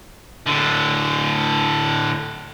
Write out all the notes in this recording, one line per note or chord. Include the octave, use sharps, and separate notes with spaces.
A2 D3